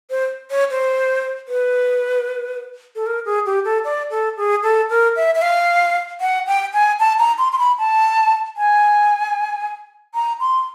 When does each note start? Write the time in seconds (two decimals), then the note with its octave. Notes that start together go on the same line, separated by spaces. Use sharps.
0.10 C5
0.50 C#5
0.70 C5
1.48 B4
2.96 A4
3.06 A#4
3.26 G#4
3.46 G4
3.65 A4
3.84 D5
4.11 A4
4.37 G#4
4.63 A4
4.90 A#4
5.16 E5
5.35 E5
5.42 F5
6.21 F#5
6.47 G5
6.74 G#5
7.00 A5
7.19 A#5
7.38 C6
7.52 C6
7.59 B5
7.78 A5
8.57 G#5
10.15 A#5
10.40 C6